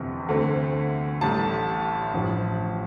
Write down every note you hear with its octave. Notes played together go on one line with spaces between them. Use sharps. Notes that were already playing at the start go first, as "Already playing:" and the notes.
Already playing: G1 F2 C3 E3
D2 D3 A3 C4
A1 A2 G3 A5
A1 G2 F3